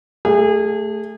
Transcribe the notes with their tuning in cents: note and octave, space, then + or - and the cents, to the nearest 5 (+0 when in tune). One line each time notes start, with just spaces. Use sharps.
A3 +5 G#4 -30